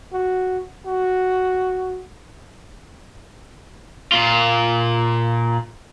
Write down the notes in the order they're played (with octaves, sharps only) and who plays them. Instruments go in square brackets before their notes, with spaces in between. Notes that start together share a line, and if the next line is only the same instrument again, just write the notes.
[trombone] F#4
F#4
[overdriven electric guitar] A#2 F4